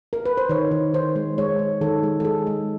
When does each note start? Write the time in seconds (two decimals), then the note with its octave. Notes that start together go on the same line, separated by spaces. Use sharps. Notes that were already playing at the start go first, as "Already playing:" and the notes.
0.13 A#4
0.26 B4
0.37 C5
0.49 D#3 C#5
0.71 D#3
0.94 D#3 C5
1.16 G#3
1.38 G#3 C#5
1.59 G#3
1.81 D#3 A4
2.03 G#3
2.20 A4
2.25 G#3 G#4
2.47 G#3